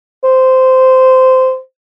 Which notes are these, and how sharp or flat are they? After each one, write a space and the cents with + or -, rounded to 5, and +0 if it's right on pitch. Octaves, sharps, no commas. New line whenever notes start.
C5 -15